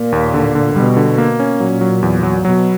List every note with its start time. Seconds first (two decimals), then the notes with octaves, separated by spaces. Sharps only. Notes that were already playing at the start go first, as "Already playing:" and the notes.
Already playing: A#2
0.12 D#2
0.34 D3
0.55 D3
0.75 B2 G3
0.97 D3
1.18 A#3
1.40 C#4
1.59 A#2 F#3
1.81 F#3
2.03 E2
2.23 F#3
2.44 B2 F#3